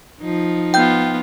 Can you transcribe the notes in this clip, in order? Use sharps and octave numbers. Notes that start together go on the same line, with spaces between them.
F3 D#4
B3 F4 G5 G6